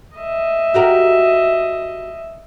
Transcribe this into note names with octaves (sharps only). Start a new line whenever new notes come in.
D#5 E5
F#4 G4 A#4